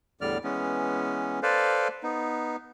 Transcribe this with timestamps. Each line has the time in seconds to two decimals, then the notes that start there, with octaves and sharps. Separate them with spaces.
0.21 E2 A2 D3 G3 D5 F6
0.44 E3 G#3 B3 C#4
1.43 A4 B4 C5 D5 F5
2.03 B3 D#4